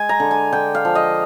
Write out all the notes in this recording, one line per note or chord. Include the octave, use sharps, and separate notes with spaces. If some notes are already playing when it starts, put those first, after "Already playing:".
Already playing: G#3 G#5
A#5
D3
G#5
D3 G5
F5
F3
D#5